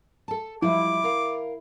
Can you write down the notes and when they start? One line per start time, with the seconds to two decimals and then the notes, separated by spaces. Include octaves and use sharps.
0.28 A4 A5
0.62 F3 G3 G#3 E4 D6
1.03 A#4 F5